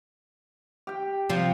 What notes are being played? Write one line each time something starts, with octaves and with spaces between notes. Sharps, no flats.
G4 G5
C3 F3